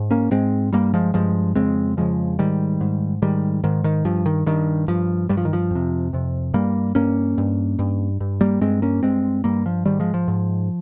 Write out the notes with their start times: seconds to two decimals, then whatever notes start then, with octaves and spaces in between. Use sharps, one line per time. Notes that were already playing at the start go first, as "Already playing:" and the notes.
Already playing: G#2
0.11 A#3 C#4
0.31 G#2 G#3 C4
0.73 G2 G3 A#3
0.94 F3 G#3
1.14 G2 F3 G#3
1.55 F2 C#3 G#3 C4
1.97 F2 C#3 F3 G#3
2.39 G#2 D#3 G3
2.81 G#2
3.22 G#2 D#3 G3
3.64 G#2 D#3
3.84 D#3
4.05 G2 F3
4.26 D#3
4.46 G2 D#3
4.88 G2 F3
5.29 G2 G3
5.37 F3
5.45 D#3
5.53 F3
5.71 F2 C3
6.13 F2 C3
6.54 G2 G3 A#3
6.95 G2 A#3 C#4
7.38 G2
7.79 G2
8.20 G2
8.41 G3 A#3
8.61 G2 G#3 C4
8.82 A#3 C#4
9.03 G2 G#3 C4
9.44 G2 G3 A#3
9.66 F3
9.86 G#2 D#3 G3
10.00 F3 G#3
10.14 F3
10.28 G#2